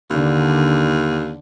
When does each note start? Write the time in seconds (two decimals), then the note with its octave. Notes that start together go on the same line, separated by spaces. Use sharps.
0.10 D#2 D3